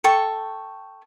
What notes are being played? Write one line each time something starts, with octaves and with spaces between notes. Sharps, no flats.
A4 G5 C#6